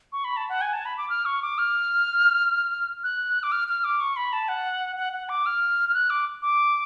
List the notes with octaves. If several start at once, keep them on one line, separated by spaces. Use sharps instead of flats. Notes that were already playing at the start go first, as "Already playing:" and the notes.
C#6
B5
A5
F#5
G#5
A5
B5
D6
F6
C#6
D6
F6
F#6
D6
F6
F6
D6
C#6
B5
A5
F#5
F#5
F#5
D6
F6
F6
F#6
D6
D6